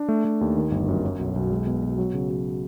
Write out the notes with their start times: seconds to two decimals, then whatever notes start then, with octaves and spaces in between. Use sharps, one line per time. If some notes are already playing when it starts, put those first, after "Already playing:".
Already playing: D4
0.09 A3
0.25 A3
0.41 D#2
0.57 D#3
0.72 G1
0.88 F#2
1.04 F#3
1.19 B1
1.36 B1
1.51 G#3
1.67 B2
1.83 B2
1.98 F#3
2.14 C#3
2.30 F#3